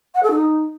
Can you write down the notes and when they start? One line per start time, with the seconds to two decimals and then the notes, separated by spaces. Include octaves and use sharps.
0.15 F#5
0.23 A4
0.31 D#4